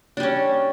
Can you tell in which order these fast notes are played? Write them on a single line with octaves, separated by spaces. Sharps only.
D4 G3 C#4